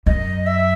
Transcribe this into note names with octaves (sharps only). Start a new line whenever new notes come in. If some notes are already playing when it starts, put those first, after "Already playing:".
F#2 D#5
E5